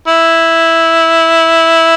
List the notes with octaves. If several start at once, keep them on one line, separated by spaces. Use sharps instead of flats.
E4